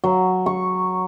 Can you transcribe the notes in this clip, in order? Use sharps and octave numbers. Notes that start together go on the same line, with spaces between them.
F#3
C#6